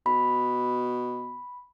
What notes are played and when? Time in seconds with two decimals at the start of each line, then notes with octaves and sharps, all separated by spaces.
0.06 B2 B5